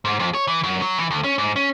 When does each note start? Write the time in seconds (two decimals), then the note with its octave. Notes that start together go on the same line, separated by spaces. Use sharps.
0.05 G#2
0.19 F2
0.34 C#5
0.48 E3
0.63 F#2
0.82 F#3
0.98 E3
1.11 D2
1.24 C#4
1.38 G#2
1.56 C#4